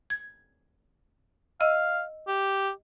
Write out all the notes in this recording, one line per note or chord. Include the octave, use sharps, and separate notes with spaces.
G#6
D#5 F5 E6
G4